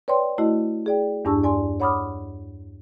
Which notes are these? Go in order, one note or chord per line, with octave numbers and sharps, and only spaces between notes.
B4 C#5 D5 G5 C6
A3 E4 F#4 D#5
G#4 D5 G5
E2 G2 D4 A5 C#6 E6
D5 G#5 C6
C#5 F#5 B5 D6 D#6 F6